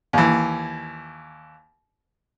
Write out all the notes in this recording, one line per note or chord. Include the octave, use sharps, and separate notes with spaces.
D#2 E3